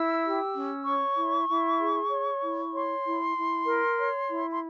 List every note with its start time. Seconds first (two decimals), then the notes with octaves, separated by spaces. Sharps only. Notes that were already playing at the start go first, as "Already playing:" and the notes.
Already playing: E4 E6
0.24 G4
0.55 C#4
0.86 C#5 C#6
1.17 E4
1.48 E4
1.78 G#4
2.10 C#5
2.41 E4
2.73 C#5 C6
3.04 E4
3.35 E4
3.66 A#4
3.97 C#5
4.29 E4
4.51 C6